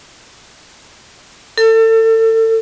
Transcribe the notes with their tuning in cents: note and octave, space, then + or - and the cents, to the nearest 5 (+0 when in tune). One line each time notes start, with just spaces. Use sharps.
A4 +30